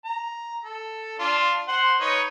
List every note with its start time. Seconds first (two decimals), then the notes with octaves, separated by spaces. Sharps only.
0.05 A#5
0.65 A4
1.19 D4 F4
1.68 C5 F#5 C6
2.00 D#4 B4 C#5